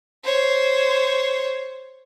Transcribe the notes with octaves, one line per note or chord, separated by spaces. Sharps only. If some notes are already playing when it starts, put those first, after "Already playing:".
C5 C#5